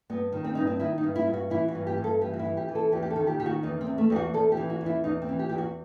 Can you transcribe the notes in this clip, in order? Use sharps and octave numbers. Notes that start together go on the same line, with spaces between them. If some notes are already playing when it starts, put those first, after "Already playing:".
G2 B3
D#3
C4
G2 D#4
C4
D#3 E4
D#4
G2
E4
G2
F#4
E3 E4
F#4
G2
G4
G2
A4
E3 G4
F#4
E4
E3
G4
E3
A4
E2 G4
G4
A4
D#3
G4
D#3 G4
F#4
E2 D#4
C4
E2
A3
E2 G4
F#4
E2 A4
G4
E3
F#4
E2
E4
E2 D#4
C4
E3
G4
E2 G4
F#4